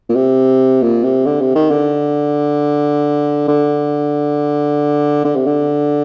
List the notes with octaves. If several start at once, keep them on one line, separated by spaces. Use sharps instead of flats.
A#2
C3
A#2
C3
D3
C3
D#3
D3
D3
D3
C3
D3